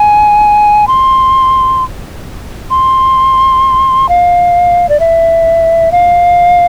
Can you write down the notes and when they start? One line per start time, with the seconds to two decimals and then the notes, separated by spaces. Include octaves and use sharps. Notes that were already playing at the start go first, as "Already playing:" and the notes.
Already playing: G#5
0.88 C6
2.70 C6
4.09 F5
4.89 D5
5.00 E5
5.92 F5